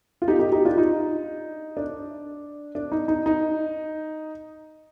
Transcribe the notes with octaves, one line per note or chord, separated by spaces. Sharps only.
F4
D#4 G4
D#4 G4
D#4 G4
D4 F4
D#4
D4
D4
D#4
D#4
D#4